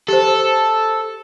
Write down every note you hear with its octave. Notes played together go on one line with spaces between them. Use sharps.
G4 A4 C5